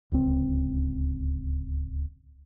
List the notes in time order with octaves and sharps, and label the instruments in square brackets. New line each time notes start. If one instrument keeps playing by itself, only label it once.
[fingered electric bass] D1 C#2 C4